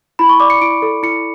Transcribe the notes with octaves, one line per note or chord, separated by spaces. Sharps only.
E4 B5
C#6
D5 D6
C#7
E4 D7
A4
E4 C#7